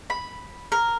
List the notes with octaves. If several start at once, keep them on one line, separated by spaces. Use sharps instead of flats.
B5
A#4